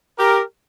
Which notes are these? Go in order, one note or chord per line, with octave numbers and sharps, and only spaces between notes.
G4 A#4